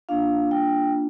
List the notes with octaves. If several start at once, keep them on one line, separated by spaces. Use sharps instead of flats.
A#3 D4 F4 F5
G5